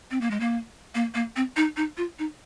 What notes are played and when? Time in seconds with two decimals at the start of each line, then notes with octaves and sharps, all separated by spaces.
0.11 C4
0.21 A#3
0.31 G#3
0.40 A#3
0.95 A#3
1.14 A#3
1.36 C4
1.56 D#4
1.77 D#4
1.97 F4
2.19 D#4